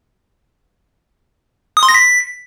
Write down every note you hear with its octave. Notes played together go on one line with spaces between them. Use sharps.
D#6
C6
A#6
B6